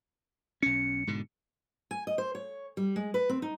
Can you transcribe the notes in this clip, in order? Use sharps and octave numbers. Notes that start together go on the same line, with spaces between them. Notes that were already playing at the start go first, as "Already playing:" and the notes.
B1 C#4 C#7
G#2 B2 D3
G#5
D#5
C5
C#5
G3
G#3
B4
C4
D#4